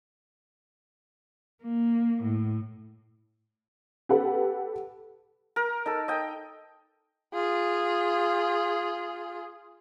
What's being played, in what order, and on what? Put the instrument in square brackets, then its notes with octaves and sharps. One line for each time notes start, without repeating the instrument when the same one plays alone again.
[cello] A#3
A2
[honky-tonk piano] G4 A4 B4 F#5
[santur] A#4
D#4 A4
D#5 G5
[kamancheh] F4 G#4